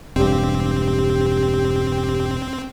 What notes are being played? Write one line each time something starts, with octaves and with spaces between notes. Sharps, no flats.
E1 G2 C4 G4